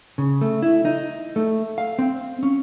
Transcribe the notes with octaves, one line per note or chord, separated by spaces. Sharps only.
C#3
A3
E4
D#4
A3
F5
C4
C#4